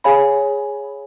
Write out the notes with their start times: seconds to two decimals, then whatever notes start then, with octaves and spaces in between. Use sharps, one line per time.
0.04 G#4 C#5 F5 G#5 B5